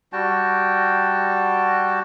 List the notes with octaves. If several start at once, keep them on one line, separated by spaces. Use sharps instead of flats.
G3 F#4 G5 A5